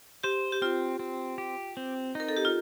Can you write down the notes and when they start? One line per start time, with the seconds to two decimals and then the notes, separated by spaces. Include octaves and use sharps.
0.24 G4 C5
0.52 G4
0.62 C4 F4
0.99 C4
1.38 G4
1.77 C4
2.15 D#4 A#4
2.29 A4
2.37 G4
2.45 F4